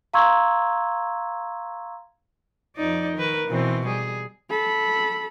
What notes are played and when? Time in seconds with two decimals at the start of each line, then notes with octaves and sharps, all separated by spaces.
0.13 F5 A#5 C6 C#6 E6 G#6
2.76 F2 D#4 D5
3.14 D#3 A#4 B4
3.48 B2 E3 C4
3.86 G3 G#4
4.50 A4 B5